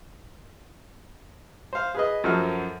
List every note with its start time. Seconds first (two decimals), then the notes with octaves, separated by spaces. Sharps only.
1.73 C5 F5
1.95 G#4 B4 D#5
2.24 F#2 F3 F#4 A4 F6